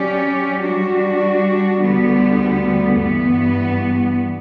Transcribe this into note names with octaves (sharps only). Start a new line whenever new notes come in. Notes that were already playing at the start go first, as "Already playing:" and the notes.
Already playing: F#3 C#4 G4 D5
G3 D4 F#4
D2 D3 G3 B3
G2 E3 B3